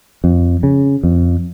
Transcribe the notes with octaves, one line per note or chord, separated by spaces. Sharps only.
F2
C#3
F2